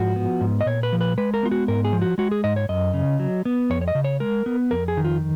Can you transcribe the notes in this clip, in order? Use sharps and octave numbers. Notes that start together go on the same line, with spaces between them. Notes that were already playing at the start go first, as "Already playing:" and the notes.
Already playing: G#2 F3 F#4
B3
G#2
D#5
A#2 C#5
B4
F3
B4
G#3 B4
A#4
B3 F4
F#4
G#2 A#4
G#4
F3
F#4
G#3 F#4
G#4
G#2 D#5
C#5
F#2 D#5
C#3
F#3
B3
F2 C#5
C#5
D#5
C#3
C#5
G#3 A#4
B3
F2 A#4
G#4
D#3
F4